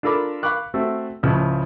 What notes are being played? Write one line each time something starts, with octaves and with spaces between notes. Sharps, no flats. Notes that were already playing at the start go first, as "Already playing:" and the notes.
D4 F4 A4 A#4 B5 D6
F5 B5 C#6 D6 F#6
A3 C4 F#4
C#2 A2 C#3 F3